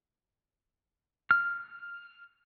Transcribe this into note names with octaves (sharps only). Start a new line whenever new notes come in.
F6